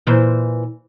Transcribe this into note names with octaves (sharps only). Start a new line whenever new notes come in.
A#2 E3 C5